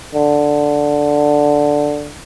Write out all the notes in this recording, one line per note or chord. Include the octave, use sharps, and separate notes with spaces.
D3